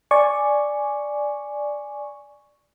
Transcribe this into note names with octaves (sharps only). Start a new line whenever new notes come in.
D5 G#5 C#6